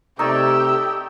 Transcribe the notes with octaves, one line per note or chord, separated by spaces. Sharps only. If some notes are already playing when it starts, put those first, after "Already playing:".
C3 A3 D#4 G4 C#5 D5 G5 E6